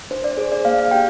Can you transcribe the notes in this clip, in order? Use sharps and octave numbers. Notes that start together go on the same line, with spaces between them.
D4 C5
D5
G#4 C5
D5
A#3 F5
F5
D4 G4 G5